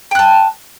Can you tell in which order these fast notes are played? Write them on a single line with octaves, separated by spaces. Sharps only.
G5 F#6 A5